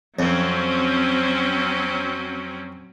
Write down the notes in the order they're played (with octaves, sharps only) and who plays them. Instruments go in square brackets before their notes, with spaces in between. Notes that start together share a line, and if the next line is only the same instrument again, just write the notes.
[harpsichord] F2 [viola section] F#3 C4 C#4